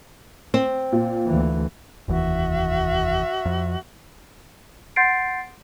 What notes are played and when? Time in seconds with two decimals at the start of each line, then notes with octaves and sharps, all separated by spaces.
0.54 C4
0.92 A#2
1.26 D2 E3
2.08 F1 D#2 E3 F#4 E5
3.46 F2
4.96 F#5 C6 G6 A6 C7 D7